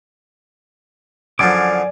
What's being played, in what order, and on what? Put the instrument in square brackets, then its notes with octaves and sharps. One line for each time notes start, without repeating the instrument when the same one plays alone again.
[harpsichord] F#2 D3 F3 [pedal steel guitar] D5 G#5 D6